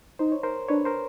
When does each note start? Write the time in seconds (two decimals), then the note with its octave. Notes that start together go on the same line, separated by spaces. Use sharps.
0.19 D#4 C5
0.32 C#5
0.43 A#4 C5
0.69 D4 B4 C#5
0.85 A#4 C5